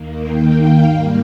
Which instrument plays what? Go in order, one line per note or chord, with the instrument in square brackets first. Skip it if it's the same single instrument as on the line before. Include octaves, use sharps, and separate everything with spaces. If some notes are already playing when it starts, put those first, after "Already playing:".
Already playing: [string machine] D#2 D#3 A#3
G5
F5
G#2 G3 A#3 F5